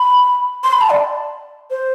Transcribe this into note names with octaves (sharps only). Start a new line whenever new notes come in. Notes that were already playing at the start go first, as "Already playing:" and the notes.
Already playing: B5
C6
B5
A5
D5
C5